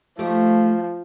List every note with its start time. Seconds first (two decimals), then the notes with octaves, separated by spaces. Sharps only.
0.19 F3 A3 D#4 G4